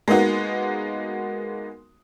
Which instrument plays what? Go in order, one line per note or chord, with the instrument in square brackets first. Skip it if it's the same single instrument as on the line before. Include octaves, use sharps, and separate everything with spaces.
[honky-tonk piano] G#3 A#3 B3 D#4 F#4